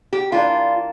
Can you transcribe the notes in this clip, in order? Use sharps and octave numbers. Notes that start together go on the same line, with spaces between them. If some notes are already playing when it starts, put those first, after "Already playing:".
G4
E3 A#3 D4 F4